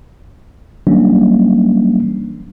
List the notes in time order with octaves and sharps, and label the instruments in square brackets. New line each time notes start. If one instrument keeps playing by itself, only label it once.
[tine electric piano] E3 F#3 G3 A#3 C#4 D4